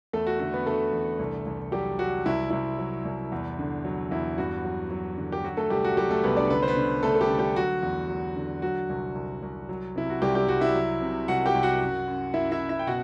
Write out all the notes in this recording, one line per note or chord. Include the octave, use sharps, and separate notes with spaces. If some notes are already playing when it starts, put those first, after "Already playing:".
E2 A3 A4
F#4
D3 A3 A4
B3 B4
D3 A3 A4
E2
C2
C2
F#3 G3 G4
F#3 F#4
C2 E4
C2 E4
F#3
C2
E2
D3
F#3
E2 E4
G2 F#4
F#3
F#3
D3
G4
F#3 F#4
A3 A4
C2 G3 G4
F#4
F#3 G3 G4
A3 A4
C2 B3 B4
D4 D5
D3 B3 B4
C5
B3 B4
D3
D3 A3 A4
A4
G3 G4
D3
G3 G4
F#3 F#4
E2
F#3
D3
F#3 F#4
C2
C2
C2
F#3
C3 E4
F#4
C2 G3 G4
G3 G4
C2 F#4
E4 E5
F#3
C3
C2 F#4 F#5
G4 G5
C2
F#4 F#5
F#2
F#2
F#2 E4 E5
E4 E5
F#2
E4 E5
G5
B2 F#4 F#5